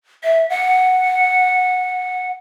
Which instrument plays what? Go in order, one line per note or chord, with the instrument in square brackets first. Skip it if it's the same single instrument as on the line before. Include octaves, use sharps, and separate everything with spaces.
[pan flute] E5
F#5